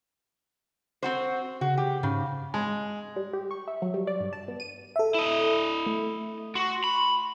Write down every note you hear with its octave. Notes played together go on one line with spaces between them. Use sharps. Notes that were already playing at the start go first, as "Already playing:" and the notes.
C4 F#4 C5
C#3 F#4
G4
G#2 C#3
G#3
G3
G4
C#6
E5
F#3
G3
D5
G2
A5
B3
D#7
A4 E5
E4 D#5
A3
F#4 C6 C#6
B5